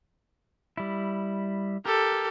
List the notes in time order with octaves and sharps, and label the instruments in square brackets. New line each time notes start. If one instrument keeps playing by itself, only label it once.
[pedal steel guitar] G3 E4
[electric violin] G4 A4 [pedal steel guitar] A#4